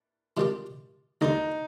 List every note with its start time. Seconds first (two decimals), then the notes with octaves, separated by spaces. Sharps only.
0.37 C3 D#3 G3 C4 G4
1.21 D#2 D3 G3 D#4